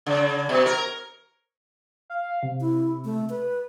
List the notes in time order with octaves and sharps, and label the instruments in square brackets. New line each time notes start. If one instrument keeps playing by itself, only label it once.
[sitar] C#3
B2
A#4
[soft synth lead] F5
C3
[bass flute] E4
A3
B4